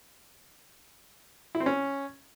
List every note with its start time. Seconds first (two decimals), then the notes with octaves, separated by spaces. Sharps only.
1.55 E4
1.60 C4
1.66 C#4